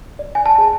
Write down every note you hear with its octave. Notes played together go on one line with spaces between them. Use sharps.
D5
G#5
A5
G#4